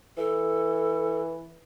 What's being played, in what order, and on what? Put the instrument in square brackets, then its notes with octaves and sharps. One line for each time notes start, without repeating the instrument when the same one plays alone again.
[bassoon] E3 [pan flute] A4